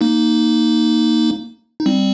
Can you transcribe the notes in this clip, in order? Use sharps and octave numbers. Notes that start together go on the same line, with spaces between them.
A#3 D#4
D#4
G3 C4